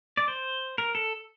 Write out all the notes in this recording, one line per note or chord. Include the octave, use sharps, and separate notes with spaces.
D5
C5
A#4
A4